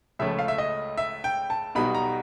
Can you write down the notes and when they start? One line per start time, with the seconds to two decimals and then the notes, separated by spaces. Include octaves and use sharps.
0.19 C#2 C#3 F3 A3 C#4 E5
0.39 F5
0.48 E5
0.58 D#5
0.98 E5
1.24 G5
1.50 A5
1.75 B1 B2 G3 B3 D#4 B5
1.95 A#5